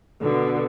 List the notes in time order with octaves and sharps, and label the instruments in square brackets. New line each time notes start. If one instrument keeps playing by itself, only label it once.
[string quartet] B2 D3